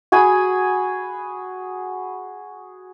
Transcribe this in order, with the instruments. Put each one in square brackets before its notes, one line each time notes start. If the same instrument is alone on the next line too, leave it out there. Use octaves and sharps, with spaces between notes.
[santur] F#4 G#4 G#5 B5